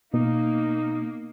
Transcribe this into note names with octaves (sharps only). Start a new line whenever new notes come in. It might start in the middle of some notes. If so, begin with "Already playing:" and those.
B2 A#3 D#4